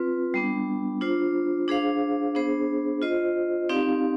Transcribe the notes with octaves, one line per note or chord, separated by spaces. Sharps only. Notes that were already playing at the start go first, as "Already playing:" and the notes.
Already playing: C4 F4 B4
G3 B3 D4
D4 F4 C5
D4 G#4 C5 F5
B3 D4 G#4 C5
F4 C5 D#5
C4 D#4 G4 D5 F5